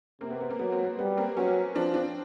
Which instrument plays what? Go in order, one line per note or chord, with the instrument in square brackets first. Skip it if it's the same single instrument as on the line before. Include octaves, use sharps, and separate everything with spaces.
[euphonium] C3 [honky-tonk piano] A#3 C4
[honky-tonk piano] B3
B3
A#3 C4
[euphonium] F#3 [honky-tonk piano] B3
[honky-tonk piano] A#3 C4
A#3
[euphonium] G3 [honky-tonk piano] B3
[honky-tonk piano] A#3 C4
[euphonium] F#3 [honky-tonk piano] B3 C#4
[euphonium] F3 [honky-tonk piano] C4 D4
[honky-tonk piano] C4 D4